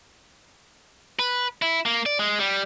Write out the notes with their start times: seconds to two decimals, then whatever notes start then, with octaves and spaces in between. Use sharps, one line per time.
1.19 B4
1.62 E4
1.86 A#3
2.06 D5
2.19 G#3
2.39 G3